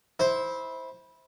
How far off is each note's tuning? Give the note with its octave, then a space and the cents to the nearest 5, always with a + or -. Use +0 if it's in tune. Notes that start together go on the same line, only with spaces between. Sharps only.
E4 -20 C5 +0